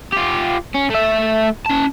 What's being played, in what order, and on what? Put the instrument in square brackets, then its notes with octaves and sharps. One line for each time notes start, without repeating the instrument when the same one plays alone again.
[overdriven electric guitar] F4 G4
C#4
A3 E5
C#4 A5